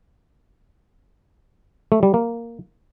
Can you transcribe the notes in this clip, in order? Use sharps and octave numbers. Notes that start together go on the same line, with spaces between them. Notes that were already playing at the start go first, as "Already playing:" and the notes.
A3
G3
A#3